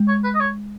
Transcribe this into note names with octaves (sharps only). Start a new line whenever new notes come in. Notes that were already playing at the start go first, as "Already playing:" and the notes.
Already playing: G#3
C#5
B4
D#5
C#5